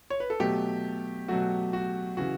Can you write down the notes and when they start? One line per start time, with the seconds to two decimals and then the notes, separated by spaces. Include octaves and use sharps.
0.10 C#5
0.20 B4
0.30 A4
0.40 B2 F#3 A3 G4
1.28 B2 F#3 A3 F#4
1.73 F#4
2.17 C#3 E3 F#4